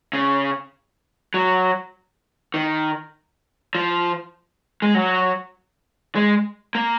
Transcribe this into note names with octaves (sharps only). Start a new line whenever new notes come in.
C#3
F#3
D#3
F3
G#3
F#3
G#3
A#3